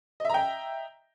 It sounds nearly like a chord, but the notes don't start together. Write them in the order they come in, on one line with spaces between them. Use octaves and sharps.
D#5 E5 A#5 G5